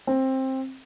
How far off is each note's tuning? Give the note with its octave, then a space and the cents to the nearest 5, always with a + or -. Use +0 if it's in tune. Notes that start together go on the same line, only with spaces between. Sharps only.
C4 +15